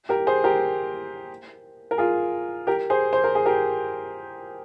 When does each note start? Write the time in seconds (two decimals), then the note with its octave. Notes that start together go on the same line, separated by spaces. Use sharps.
0.09 G4 A#4
0.27 G#4 C5
0.44 G4 A#4
1.91 A#4
1.98 F4 G#4
2.67 G4 A#4
2.90 G#4 C5
3.13 C5
3.24 A#4
3.35 G#4
3.46 G4 A#4